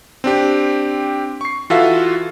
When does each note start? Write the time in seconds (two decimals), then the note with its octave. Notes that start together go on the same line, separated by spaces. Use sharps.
0.24 C4 D4 G4
1.41 C#6 C7
1.70 E3 F4 F#4 A4 E5 F5